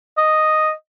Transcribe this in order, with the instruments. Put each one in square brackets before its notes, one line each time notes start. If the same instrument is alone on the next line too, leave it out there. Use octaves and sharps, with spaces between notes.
[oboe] D#5